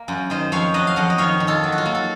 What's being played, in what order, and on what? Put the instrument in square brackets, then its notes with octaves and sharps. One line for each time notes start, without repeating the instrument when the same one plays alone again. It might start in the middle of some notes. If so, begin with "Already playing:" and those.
Already playing: [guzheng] A#3
F#2
D#3 C5 D#5
F2 C#5 F5
F#3 D#5 F#5
F5
F2 D#5 F#5
D#5
D#3 C#5 F5
D#3
F4 A4
F#3
F#4
F4
A#3
A4